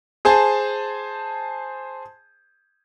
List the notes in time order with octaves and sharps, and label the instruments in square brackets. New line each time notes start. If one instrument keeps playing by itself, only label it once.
[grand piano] G#4 C5 G#5 A5